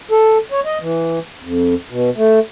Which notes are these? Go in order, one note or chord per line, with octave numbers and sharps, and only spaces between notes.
A4
C#5
D#5
E3
F2
B2
A3